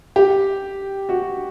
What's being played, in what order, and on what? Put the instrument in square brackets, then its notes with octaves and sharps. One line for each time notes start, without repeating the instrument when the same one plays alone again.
[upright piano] G4
F#4